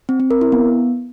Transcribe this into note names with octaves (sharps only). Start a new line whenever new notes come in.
C4
C4
A#4
E4
B3